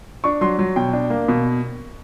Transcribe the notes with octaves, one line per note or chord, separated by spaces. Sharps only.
D4 C#6
F#3 C6
F#3
B2 G5
D4
A#3
B2